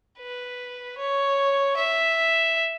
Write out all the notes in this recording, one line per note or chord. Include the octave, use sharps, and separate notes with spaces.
B4
C#5
E5